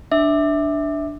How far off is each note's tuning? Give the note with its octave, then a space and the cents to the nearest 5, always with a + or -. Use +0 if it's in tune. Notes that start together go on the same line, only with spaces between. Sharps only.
D4 +0 E5 -15 D6 +15